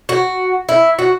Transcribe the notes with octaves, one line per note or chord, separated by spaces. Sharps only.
F#4
E4
F#4